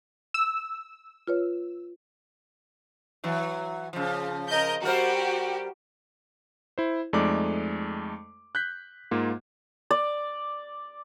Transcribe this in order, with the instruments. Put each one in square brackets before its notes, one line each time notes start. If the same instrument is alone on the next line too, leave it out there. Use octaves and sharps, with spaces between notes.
[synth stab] E6
[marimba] F4 B4 C#5
[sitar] E3 F#3
C#3 F3
[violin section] A#4 D#5 G6
[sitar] G3 A#4 C5 [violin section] F#4 G4
[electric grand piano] E4 C5
F2 G#3 A3 D#4 D5 D6
F#6 G6 B6
G#2 A#3 F4
[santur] D5